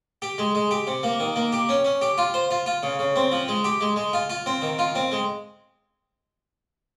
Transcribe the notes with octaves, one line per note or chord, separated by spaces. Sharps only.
G4
G#3
G#3
G4
C3
A#3
D#3
A#3
G4
C#4
C#4
G4
F4
C5
F4
F4
C#3
C#3
C4
F3
G#3
G4
G#3
G#3
F4
F4
C4
D#3
F4
C4
G#3